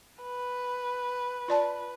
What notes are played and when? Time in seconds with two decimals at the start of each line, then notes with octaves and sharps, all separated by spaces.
0.22 B4
1.48 F4 D5 A5